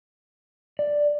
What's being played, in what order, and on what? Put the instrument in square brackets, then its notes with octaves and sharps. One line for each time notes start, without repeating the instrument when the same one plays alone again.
[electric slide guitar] D5